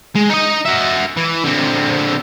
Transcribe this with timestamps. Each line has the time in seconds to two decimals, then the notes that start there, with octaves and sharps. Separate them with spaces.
0.16 G#3
0.30 D#4 D#5
0.66 F#4 E5
1.17 E3
1.44 D3 C4